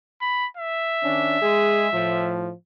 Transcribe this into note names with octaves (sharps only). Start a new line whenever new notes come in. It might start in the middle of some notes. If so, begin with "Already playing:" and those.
B5
E5
D#3 C#4 D4
G#3 G#4
A2 F3